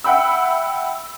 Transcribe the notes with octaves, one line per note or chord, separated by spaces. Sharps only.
E5 F#5 G5 B5 E6